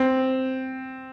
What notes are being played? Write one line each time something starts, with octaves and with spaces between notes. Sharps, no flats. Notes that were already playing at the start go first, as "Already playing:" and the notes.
Already playing: C4